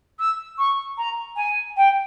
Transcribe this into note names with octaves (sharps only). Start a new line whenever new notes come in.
E6
C#6
A#5
G#5
G5